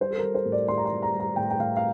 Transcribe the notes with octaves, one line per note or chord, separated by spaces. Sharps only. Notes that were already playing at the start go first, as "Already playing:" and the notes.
G3 C5
A4
G3 A#4
C5
A2
D5
A2 C6
A#5
C6
G3
A#5
G3
A#5
A2 G5
G5
A2 F5
F5